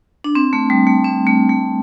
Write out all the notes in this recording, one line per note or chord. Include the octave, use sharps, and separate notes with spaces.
D4
C4
A3
G3
A3
C4
A3
A3